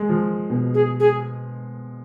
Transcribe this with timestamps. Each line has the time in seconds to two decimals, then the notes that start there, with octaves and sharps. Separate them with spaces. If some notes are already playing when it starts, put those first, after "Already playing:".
Already playing: G#3
0.09 F3
0.50 B2
0.74 G#4
1.00 G#4